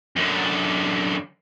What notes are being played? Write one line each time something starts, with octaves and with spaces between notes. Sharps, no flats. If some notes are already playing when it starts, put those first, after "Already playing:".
F#2 D3